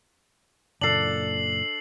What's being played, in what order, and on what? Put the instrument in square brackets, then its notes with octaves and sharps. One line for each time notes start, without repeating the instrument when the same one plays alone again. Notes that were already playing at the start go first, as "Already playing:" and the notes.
[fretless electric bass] F#1 A#2 [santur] D4 A4 [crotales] C7 F#7